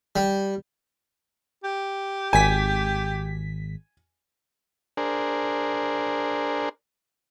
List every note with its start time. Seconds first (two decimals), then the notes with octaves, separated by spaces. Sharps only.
0.16 G3
1.64 G4
2.33 G#1 G#5 B6
4.97 D4 G#4 A#4 C5